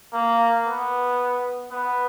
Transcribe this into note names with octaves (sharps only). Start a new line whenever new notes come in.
A#3
B3
B3